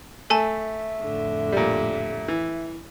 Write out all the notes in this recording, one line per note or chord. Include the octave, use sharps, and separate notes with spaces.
A3 A4 E5 G#5 A5
F2 A2 D3
A#2 G3
E3